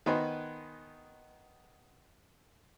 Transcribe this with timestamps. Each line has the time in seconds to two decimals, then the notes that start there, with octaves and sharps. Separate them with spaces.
0.06 D#3 B3 D#4 B4 C5 G#5